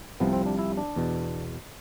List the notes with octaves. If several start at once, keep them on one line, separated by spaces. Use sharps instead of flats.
C2 C3 F3 B3
C4
D4
E4
D4
E2 B2